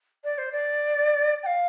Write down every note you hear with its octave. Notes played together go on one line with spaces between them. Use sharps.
D5
C5
D5
G5
F5